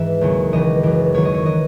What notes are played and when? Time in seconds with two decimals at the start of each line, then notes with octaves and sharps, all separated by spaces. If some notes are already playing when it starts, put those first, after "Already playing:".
Already playing: G#2 E3 E5
0.21 D#2 C#3 F#3
0.52 C#2 C#3 E3 D#5
0.83 F#2 E3
1.14 D#2 D#3 F#3 C#5
1.25 D#5
1.34 C#5
1.45 E3 D#5